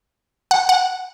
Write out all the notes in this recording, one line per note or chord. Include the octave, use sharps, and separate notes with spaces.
F#5
F#5